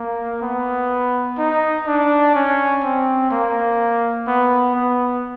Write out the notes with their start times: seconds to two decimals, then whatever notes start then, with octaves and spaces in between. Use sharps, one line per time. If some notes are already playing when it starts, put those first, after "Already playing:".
Already playing: A#3
0.42 B3
1.38 D#4
1.87 D4
2.35 C#4
2.83 C4
3.31 A#3
4.27 B3
4.75 B3